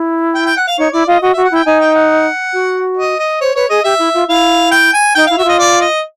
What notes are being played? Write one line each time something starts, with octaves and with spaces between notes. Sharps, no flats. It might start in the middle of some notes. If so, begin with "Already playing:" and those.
Already playing: E4
G5
G5
F#5
F5
D#4 C#5
E4 D5
F4 D#5
F#4 D#5
F#4 E5
F#5
E4 G5
D#4 G#5
G5
F#5
F#4
D#5
D#5
C5 C#5
B4 C#5
G#4 D#5
G4 E5
E4
F4
E4 F5
G5
G#5
D#4 G5
E4 F5
F#4 E5
F4 D#5
D5
D#5